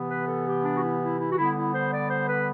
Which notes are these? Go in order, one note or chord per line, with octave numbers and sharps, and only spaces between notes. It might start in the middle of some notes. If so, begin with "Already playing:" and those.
Already playing: C3 E3 B3
B4
A4
G4
D4
F#4
E4
E4
E4
F#4
D3 G3 B3 E4
E4
C5
D5
C5
B4